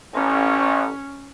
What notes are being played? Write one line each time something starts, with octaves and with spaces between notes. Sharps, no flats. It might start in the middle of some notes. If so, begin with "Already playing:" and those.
A1 C#4